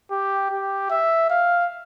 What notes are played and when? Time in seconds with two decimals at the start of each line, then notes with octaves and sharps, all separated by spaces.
0.11 G4
0.51 G4
0.91 E5
1.30 F5